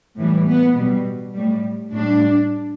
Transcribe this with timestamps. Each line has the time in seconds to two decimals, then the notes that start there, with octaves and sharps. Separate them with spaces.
0.16 A2 E3 G3
0.46 B3
0.74 B2 G3
1.33 A2 G3
1.91 A2 G3 D4